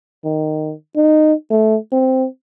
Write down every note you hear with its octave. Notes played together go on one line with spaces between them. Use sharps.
D#3
D#4
A3
C4